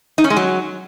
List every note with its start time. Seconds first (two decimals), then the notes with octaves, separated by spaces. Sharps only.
0.18 D#4
0.24 C#4
0.30 G#3
0.37 F#3